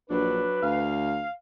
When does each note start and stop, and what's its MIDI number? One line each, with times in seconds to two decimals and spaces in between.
0.10 0.44 34
0.10 0.62 54
0.10 0.62 62
0.10 0.91 71
0.63 1.25 38
0.63 1.32 77